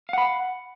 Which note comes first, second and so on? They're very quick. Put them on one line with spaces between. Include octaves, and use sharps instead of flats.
F5 F#5 B5